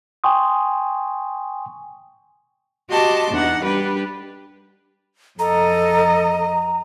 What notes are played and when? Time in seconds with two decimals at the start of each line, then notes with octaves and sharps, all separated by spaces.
0.24 G5 G#5 C6 C#6 D#6
2.89 F#4 G4 D#5 A5 C6 D6
3.31 E2 D4 D#4 F#5
3.61 G3 D4 G4 B4
5.39 F2 A4 D#5 A#5